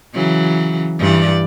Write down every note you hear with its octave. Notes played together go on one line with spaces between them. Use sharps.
C#3 E3 F#3
G2 E3 D5